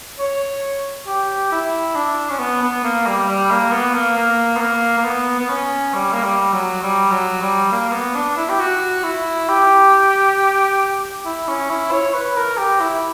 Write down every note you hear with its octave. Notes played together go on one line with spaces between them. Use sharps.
C#5
G4
E4
D4
C#4
B3
B3
A#3
G3
G3
A#3
B3
A#3
A#3
B3
A#3
A#3
B3
B3
C#4
G3
A#3
G3
F#3
G3
F#3
G3
A#3
B3
D4
E4
G4
F#4
E4
G4
E4
C#4
E4
C#5
B4
A#4
G4
E4